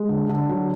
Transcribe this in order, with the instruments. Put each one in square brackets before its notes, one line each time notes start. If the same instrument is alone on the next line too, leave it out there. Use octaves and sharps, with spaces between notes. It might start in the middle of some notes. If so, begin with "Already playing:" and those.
Already playing: [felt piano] G#3
D3
D3
F#3